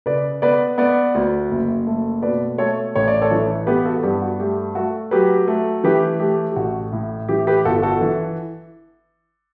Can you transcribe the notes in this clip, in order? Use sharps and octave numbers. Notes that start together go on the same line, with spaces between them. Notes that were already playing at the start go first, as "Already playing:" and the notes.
C#3 B4 D5
B3 B4 D5
B3 B4 D5
D2
F#1
A3
B2 B4 D5
A3 A4 C#5
A1 C#5
D5
A4 C#5
E3
B3 G4 B4
F#4 A4
G2 G4
F#4
A3 G4
A3 F#4 A4
F#3 G4 B4
A3
E3 G4 B4
A3 G4
G4
A1 F#4
A2
E3 G4
G4 B4
G1 F#4 A4
F#4 A4
E3